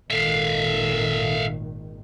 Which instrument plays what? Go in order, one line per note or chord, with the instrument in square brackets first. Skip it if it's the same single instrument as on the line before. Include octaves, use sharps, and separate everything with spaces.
[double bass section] G#1 A#2 D#3 [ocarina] A4 [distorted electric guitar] E5 F5